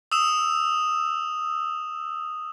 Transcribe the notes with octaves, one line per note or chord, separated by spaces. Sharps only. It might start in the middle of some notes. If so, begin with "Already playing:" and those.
D#6 E6 E7